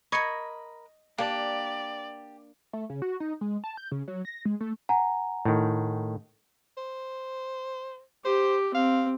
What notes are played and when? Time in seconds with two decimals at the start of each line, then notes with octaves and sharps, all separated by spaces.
0.12 A#4 D#5 B5 C#6 G#6 C#7
1.18 A#3 D4 G4 D5
2.73 A3
2.90 C#3
3.02 F#4
3.20 D#4
3.41 G#3
3.64 A5
3.77 G6
3.92 C#3
4.08 F#3
4.25 A#6
4.45 G#3
4.60 A3
4.89 F#5 G#5 A#5
5.45 A2 D#3
6.78 C5
8.25 G4 C5
8.75 C4 F5